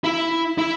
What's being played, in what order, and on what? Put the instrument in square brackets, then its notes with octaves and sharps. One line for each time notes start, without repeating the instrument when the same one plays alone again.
[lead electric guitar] E4
E4